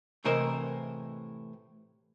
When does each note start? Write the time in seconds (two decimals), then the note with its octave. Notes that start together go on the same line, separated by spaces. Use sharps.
0.24 A2 C3 E3 A#4 C5 D#5